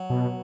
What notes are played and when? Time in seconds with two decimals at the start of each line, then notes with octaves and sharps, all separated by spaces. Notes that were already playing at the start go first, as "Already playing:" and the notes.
Already playing: F#3
0.10 B2